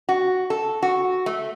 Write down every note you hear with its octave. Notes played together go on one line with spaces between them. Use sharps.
F#4
A4
F#4
A3